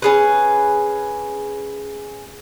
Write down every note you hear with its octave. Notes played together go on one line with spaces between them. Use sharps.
C#4 G#4 B4